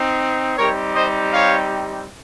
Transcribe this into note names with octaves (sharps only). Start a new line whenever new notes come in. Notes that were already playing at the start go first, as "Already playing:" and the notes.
Already playing: C4 D#4
G3 C4 D#4 G4 A#4 C#5
C5 D#5
C#5 F5